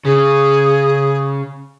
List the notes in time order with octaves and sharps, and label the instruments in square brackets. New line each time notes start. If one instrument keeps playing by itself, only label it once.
[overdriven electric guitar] C#3 [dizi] G#4